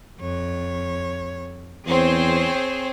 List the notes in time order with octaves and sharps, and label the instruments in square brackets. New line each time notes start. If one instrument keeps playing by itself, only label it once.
[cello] F2 C#5
[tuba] E2 [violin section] C4 C5 [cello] G#4 C#5